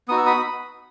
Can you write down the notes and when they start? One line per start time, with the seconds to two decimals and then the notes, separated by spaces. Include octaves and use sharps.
0.08 B3 D#4 F#4 D#6
0.17 E6
0.26 B5 D#6